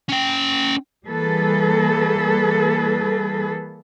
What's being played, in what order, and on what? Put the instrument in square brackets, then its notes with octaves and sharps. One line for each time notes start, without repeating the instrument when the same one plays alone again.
[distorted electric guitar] C#4 G5
[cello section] E3 G3 A#3 G#4 A4 B4